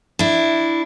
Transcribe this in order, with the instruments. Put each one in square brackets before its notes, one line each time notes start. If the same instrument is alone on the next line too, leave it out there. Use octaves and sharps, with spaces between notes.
[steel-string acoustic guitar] D4 E4